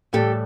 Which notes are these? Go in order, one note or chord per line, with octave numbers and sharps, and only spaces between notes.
A2 E3 G3 G4 A4